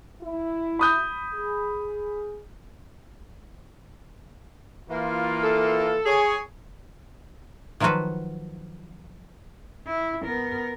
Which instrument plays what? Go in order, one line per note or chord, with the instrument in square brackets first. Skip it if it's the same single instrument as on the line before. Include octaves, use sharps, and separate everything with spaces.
[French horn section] E4
[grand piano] B5 D#6 G6
[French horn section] G#4
[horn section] E3 A#3 F4
[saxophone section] A4
[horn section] G#4 C#5
[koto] D#3 F3 F#3 F4 F#4 B4
[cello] E4
B3 A#4